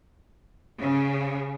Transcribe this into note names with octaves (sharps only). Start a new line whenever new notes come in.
C#3